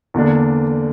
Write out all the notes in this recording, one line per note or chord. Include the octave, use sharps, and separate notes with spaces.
E2 D3 A#3 D4